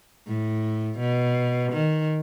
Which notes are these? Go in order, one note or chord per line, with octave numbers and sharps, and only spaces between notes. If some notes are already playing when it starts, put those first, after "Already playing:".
A2
B2
D#3